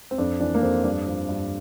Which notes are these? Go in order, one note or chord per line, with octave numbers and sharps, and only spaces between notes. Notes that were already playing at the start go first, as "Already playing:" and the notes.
C4
F2 D4
E3 D4
A#3
F2 C4
G2 D4
F3
G2